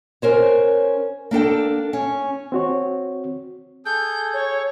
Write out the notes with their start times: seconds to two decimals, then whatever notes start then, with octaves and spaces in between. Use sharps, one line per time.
0.22 C#4 A#4 C5 C#5
1.31 A#3 D4 A4 G5
1.93 C#4
2.52 C4 F#4 C#5
3.86 G#4 A4 G6
4.33 C#5